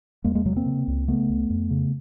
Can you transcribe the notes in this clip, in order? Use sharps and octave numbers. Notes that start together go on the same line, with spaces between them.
E2 G#3 A#3
G#3 A#3
C3 F#3 G#3
A#3 C4
C#3
C#2
C#3 A3 B3
C#2
F2
C#3